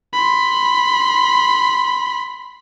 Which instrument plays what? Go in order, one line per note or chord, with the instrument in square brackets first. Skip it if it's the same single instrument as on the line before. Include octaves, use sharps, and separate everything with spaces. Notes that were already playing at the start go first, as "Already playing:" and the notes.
[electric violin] B5 C6